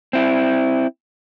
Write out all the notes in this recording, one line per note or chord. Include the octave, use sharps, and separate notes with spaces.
C4 E4